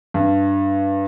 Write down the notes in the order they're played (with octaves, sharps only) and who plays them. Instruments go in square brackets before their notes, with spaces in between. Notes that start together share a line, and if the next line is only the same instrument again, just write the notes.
[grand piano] G2